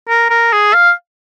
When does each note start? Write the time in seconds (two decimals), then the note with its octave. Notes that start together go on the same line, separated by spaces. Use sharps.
0.09 A#4
0.30 A#4
0.52 G#4
0.74 F5